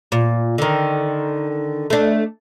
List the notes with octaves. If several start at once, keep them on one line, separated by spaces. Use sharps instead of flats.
A#2
D3 D#3
A3 D4